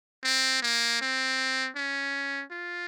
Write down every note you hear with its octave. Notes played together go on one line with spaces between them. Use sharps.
C4
A#3
C4
C#4
F4